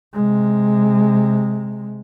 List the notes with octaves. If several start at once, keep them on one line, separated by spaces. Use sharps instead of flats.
C3 G#3